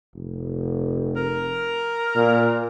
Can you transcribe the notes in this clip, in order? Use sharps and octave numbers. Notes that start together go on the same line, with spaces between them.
F1
A#4
A#2